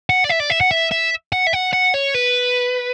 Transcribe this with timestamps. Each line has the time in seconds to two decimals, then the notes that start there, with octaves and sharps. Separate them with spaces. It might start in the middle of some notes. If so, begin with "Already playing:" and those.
0.10 F#5
0.24 D5
0.30 E5
0.40 D5
0.50 E5
0.61 F#5
0.71 E5
0.91 E5
1.32 F#5
1.46 E5
1.53 F#5
1.73 F#5
1.94 C#5
2.14 B4